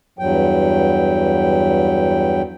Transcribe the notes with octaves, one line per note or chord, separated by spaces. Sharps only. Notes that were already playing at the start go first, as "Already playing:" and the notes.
E2 G2 F#3 G5